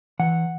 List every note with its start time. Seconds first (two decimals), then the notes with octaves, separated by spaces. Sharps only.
0.19 E3 F#5